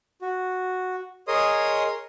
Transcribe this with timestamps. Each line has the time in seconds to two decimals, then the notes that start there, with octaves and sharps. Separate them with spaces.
0.22 F#4
1.28 G#4 A#4 C#5 D#5 C6 D#6